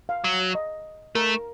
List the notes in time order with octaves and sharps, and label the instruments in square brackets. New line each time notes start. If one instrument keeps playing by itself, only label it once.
[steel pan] F5
[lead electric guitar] F#3
[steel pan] D#5
[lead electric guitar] A3 [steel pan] A#4